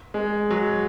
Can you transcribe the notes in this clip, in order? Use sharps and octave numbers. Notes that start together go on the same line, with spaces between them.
G#3
F#3